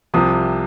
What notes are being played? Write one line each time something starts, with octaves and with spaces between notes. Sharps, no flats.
C2 C3 F3 D#6